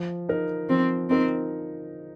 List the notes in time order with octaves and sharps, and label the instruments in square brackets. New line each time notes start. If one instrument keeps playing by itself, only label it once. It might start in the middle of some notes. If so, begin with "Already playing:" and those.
Already playing: [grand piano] F3
D#4 A#4
[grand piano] F3 [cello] C4
[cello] C4 [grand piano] D#4 A#4